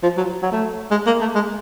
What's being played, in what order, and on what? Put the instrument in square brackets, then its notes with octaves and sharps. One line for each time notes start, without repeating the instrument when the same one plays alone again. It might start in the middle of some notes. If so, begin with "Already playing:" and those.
[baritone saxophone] F3
F#3
F#3
A3
G#3
A#3
A3
G#3